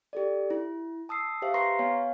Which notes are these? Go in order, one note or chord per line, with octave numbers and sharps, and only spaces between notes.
G4 A4 D5
E4
A5 D#6 E6 C7
G4 C5 E5 F5
B4 A#5 C6 C#6 A#6 C7
B3 C#5 F5 G#5